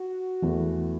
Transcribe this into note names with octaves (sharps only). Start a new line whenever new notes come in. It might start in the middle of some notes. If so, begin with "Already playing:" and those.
Already playing: F#4
E2 E3 A3